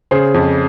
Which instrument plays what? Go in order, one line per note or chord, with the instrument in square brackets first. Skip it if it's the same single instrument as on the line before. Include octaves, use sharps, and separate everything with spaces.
[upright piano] C#3 G#4 C5
F2